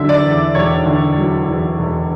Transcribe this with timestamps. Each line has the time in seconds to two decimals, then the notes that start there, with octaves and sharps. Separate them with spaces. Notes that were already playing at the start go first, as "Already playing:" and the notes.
Already playing: D3 F#3 E5
0.09 D5
0.24 E2
0.55 E1 C#5
0.86 D3
1.17 F#3
1.48 E2
1.79 E1